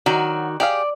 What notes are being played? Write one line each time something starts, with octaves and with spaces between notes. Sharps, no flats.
D#3 F#3 F#4 D5
G4 G#4 D5 F5